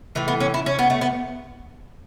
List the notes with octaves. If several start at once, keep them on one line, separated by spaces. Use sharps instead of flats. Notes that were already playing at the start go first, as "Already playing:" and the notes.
A2 E3 A3
B3
C#4
E4
C#4
B3
A3
B3